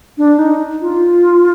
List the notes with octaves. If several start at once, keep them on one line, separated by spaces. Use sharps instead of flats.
D4
D#4
F4